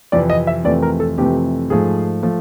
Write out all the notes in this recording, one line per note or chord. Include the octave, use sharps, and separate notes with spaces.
F2 C3 E3 D5
D#5
E5
F2 C3 E3 A3 D5
A#4
A4
F2 C3 E3 A3 G4
G#2 F3 A3 G#4
F3 A3